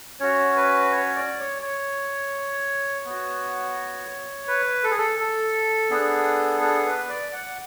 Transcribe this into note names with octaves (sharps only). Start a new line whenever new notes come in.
C#4 F#4 C#5
B4
C#5
D5
C#5
C#5
B3 F#4
B4
A4
G#4
A4
A4
B3 D4 G#4
A4
B4
D5
F#5